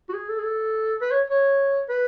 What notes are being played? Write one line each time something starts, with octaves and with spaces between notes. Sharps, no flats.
F#4
G#4
A4
G#4
A4
B4
C#5
C#5
B4